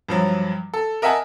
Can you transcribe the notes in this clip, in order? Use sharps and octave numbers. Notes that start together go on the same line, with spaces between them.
G2 F3 F#3
A4
A#4 D#5 E5 F#5 G#5 A5